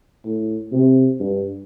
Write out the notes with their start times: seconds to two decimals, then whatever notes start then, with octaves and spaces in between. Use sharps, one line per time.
0.25 A2
0.72 C3
1.20 G2